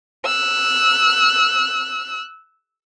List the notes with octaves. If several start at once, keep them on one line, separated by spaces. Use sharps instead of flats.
E6 F#6